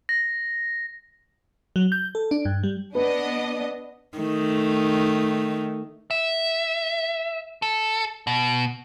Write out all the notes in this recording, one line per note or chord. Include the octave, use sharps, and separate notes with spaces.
A#6
F#3
G6
A4
D4
G2
G3
B3 D4 B4 D#5
D#3 A3
E5
A4
B2